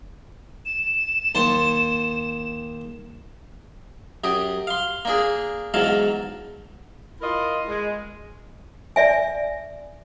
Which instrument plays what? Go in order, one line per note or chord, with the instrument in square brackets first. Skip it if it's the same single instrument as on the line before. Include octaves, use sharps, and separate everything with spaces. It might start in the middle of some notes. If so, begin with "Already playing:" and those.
[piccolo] E7
[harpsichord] D#2 C5 A5
F#2 G4 D#6
F5 C6
A#3 D4 G#4
E2 G#2 F#3 F5 A5
[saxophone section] E4 F4 A#4 D#5
G#3
[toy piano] D5 E5 G#5